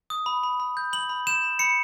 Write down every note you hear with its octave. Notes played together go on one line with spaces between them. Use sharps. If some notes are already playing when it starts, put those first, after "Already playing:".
D#6
B5
B5
B5
G6
B5 F#7
B5
G6 E7
B5
B5 C#7